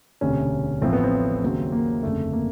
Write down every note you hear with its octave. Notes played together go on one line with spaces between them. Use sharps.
E1 D2 C3 C#4
A1 A2 F3 C4
B3
C4
D#2 C#3 F#3
A#3
G1 F2 C#3 A3
A#3